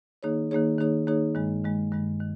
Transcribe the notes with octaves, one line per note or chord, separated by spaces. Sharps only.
D#3 A#3 D#4 G#4 C#5
D#3 A#3 D#4 G#4 C#5
D#3 A#3 D#4 G#4 C#5
D#3 A#3 D#4 G#4 C#5
G2 D#3 G#3
G2 D#3 G#3
G2 D#3 G#3
D#3